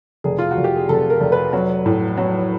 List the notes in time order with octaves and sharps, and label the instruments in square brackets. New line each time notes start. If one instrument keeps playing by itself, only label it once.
[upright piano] F1 G#4
F4
F#4
F1
G4
G#4
F1 A4
A#4
F1
B4
F#3
A2
F#3